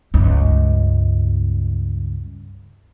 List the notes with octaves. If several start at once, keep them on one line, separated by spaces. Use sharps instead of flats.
C#2 G2